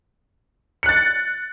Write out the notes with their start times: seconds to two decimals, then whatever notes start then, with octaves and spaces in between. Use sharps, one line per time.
0.83 C#7
0.86 F#6
0.89 A6